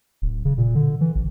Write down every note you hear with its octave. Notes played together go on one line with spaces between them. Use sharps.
D1
C#3
A#2
D3
E3
A1